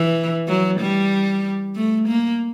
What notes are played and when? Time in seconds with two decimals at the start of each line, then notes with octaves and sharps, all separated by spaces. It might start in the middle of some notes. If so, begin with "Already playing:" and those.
Already playing: E3
0.48 F#3
0.80 G3
1.76 A3
2.08 A#3